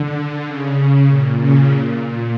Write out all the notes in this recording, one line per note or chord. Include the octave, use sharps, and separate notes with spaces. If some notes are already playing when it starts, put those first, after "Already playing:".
Already playing: D3
C#3
C#3
A#2
C#3
A#2